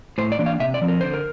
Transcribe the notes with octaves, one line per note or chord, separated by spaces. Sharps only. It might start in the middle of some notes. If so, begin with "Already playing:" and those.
A2 C5
D5
E3 A#3 D4
F5
C3 E5
D5
F3 C4
A#4
D3 C5
A#4